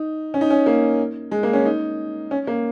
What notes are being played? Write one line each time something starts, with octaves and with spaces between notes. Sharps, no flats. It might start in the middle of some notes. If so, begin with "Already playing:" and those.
Already playing: D#4
C#4
D#4
C#4
A#3
G#3
A#3
C#4
D#4
C#4
A#3